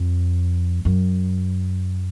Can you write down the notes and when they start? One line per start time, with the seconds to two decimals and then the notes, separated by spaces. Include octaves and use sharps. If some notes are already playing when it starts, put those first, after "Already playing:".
Already playing: F2
0.85 F#2